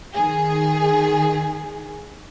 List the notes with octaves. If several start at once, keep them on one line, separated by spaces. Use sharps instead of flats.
D#3 G#4